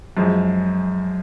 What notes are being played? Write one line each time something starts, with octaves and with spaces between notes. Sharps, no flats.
F#2 F3 G#3